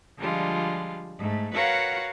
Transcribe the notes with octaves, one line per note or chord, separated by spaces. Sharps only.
D3 F3 G3 G#3 F4
G#2 A3
F#4 A#4 B4 C#5 F5 F#5